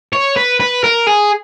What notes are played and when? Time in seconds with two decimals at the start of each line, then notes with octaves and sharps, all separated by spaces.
0.13 C#5
0.36 B4
0.60 B4
0.84 A#4
1.07 G#4